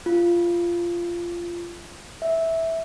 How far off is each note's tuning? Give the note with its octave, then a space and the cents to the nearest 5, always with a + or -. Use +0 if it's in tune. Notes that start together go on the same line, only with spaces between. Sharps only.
F4 -15
E5 -10